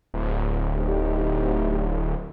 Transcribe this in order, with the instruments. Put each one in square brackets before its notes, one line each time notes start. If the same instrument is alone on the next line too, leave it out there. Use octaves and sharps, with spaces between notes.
[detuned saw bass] D1
[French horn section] D2 D#4 G4